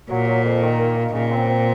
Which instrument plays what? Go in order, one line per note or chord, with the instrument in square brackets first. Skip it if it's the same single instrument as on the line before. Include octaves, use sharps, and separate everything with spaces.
[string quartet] A#2 [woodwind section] F#3
[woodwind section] F#3
F2
D#3
A#3
D#3
[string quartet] A#2 [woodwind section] C#3
[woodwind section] C4
C4